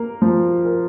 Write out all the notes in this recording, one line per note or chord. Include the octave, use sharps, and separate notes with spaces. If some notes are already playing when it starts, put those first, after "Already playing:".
Already playing: A#3 A#4
F3
A#4